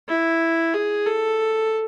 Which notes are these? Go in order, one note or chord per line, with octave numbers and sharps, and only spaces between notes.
E4
G#4
A4